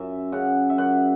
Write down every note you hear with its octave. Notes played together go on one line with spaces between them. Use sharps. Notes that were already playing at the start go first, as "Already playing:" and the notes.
Already playing: F#2 E5
C#3 F#5
E5
F#2 F#5